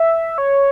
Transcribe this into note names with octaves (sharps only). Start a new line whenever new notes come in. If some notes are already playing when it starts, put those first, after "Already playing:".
Already playing: E5
C#5